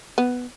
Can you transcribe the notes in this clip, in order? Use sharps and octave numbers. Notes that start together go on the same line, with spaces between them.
B3